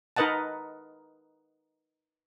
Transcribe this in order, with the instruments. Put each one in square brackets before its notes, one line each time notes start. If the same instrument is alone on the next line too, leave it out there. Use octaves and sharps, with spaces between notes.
[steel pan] D#4 A#4 B4 D#5 F#5 A5